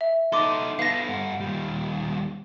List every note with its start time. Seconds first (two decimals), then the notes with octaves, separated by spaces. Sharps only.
0.01 E5
0.32 D#4 A4 C6 D6
0.79 B3 A4 F5 A#6
1.09 G2 F#5
1.40 D#2 G3